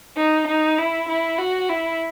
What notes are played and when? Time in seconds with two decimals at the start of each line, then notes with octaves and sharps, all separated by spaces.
0.16 D#4
0.47 D#4
0.78 E4
1.08 E4
1.39 F#4
1.69 E4